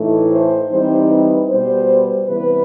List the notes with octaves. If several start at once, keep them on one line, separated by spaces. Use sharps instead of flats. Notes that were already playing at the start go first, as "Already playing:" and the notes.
Already playing: A2 E3 A3 D#4
C5
E3 G3 C4 D#4 C5
B4
B2 G3 B3 C5
C3 E3 G3 B3 B4